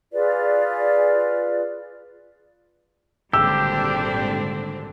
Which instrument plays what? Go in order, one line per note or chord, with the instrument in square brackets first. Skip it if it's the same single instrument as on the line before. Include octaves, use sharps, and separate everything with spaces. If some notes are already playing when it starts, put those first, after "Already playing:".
[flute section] F4 G#4 B4 D5
[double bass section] G#1 A#2 D3 [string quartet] G3 C4 D4 [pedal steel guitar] G4 [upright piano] E6